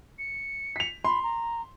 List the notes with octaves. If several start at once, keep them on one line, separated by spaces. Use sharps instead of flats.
C#7
B6 F7
B5 C6
A#5